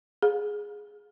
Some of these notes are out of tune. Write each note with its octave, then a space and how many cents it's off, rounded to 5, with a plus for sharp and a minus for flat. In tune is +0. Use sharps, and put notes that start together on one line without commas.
G#4 +0 F5 +45